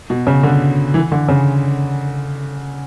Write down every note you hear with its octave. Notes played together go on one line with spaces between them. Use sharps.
B2
C#3
D3
E3
D3
C#3